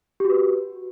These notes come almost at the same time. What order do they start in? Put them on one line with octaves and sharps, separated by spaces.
G4 F#4 B4